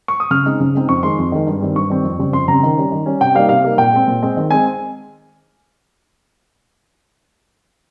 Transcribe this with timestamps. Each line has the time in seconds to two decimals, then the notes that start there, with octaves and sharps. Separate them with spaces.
0.08 C#6
0.20 D#6
0.31 C#3 F6
0.46 G#3 C4 D#4
0.60 C#3
0.75 G#3 C4 D#4
0.89 F2 C#6
1.03 D#3 G#3 D#4 C6
1.18 F2
1.32 D#3 G#3 D#4
1.47 G2
1.61 D#3 G3 C4
1.75 G2 C#6
1.90 D#3 G3 C4
2.05 F2
2.19 C#3 G3 C4
2.33 F2 C6
2.48 C#3 G3 C4 A#5
2.63 D#3
2.77 G3 C#4
2.92 D#3
3.06 G3 C#4
3.21 C3 G5
3.35 G3 A#3 D#4 F5
3.49 C3 F5
3.64 G3 A#3 D#4
3.78 A#2 G5
3.93 G#3 C4
4.08 A#2
4.23 G#3 C4
4.37 D#3
4.51 G#3 C4 G#5